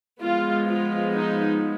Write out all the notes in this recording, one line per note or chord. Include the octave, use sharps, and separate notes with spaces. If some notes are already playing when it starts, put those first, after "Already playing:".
F3 G#3 B3 F4
F4
D#4